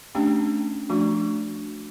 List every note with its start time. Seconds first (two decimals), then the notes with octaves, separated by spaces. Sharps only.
0.15 A3 C#4 D4 G4 G5
0.89 F3 A3 D4 F#4